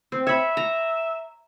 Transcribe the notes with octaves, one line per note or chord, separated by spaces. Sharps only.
C4
C#5 E5 B5
A#5